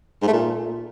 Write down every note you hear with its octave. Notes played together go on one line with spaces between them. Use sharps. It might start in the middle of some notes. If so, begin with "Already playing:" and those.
G#2
A3
A#2